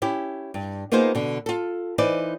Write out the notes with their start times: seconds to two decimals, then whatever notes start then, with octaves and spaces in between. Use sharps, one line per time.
0.02 C#4 E4 G4
0.54 G2
0.92 A#3 B3 D#4 F4 G#4 C5
1.15 B2 D3
1.46 F4 A4
1.98 E3 D#4 B4 C5 D5